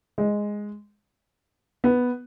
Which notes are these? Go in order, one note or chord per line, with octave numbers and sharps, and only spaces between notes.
G#3
B3